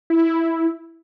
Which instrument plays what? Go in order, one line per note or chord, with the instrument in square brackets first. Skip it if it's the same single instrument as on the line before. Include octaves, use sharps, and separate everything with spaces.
[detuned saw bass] E4